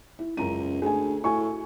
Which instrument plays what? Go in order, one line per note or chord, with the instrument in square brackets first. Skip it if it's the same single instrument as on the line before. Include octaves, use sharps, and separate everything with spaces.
[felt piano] E4
[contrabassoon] C#2 [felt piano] F#2 A#5 D#7
[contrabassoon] D2 [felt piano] G#4 G#5
[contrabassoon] A2 [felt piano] F#4 G#5 C#6